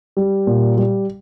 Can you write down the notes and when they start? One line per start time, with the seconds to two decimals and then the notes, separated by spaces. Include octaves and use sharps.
0.17 G3
0.47 A#2
0.78 G3